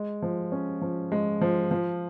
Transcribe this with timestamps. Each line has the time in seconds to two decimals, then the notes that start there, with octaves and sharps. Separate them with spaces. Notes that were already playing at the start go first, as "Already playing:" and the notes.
Already playing: G#3
0.22 F3
0.52 C#4
0.82 F3
1.12 G#3
1.41 F3
1.71 F3